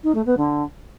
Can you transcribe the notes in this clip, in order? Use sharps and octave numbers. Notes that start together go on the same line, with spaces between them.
D#4
A3
B3
D3